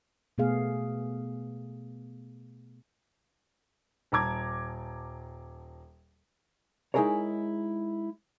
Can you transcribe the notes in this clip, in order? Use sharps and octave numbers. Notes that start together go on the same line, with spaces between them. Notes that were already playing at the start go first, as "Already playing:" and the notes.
B2 A3 B3 G#4 F5
D#1 A5 A#5 D6 G#6
G#3 D#4 E4 G#4 A#4 C#5